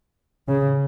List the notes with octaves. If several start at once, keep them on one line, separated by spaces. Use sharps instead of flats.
C#3